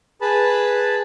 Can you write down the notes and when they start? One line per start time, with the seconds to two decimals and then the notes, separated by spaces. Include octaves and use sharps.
0.21 G#4 B4 A5 B5